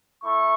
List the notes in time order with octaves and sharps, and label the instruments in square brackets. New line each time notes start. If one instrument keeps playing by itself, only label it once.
[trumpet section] A3 E4 C#6